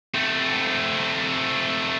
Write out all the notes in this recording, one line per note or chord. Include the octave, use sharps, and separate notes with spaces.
A3 C4